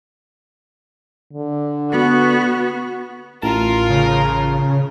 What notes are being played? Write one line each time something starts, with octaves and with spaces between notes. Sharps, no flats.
D3
B3 F#4
A1 F4 A#4 A5
C#3